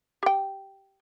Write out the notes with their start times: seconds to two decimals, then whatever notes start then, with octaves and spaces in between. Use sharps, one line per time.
0.23 G4 G5